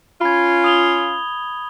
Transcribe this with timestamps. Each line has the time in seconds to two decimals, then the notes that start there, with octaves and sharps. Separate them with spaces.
0.21 C#4 F4 B5 G#6
0.64 D#6 F7 G7